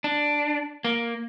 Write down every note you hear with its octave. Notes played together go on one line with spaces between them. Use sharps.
D4
A#3